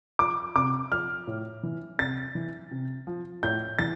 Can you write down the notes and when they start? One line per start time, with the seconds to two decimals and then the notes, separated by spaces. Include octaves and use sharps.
0.19 F3 D6
0.55 C3 D6
0.91 F3 F6
1.27 A2
1.63 E3
1.99 C3 A6
2.35 E3
2.71 C3
3.07 F3
3.43 A2 G6
3.79 E3 A6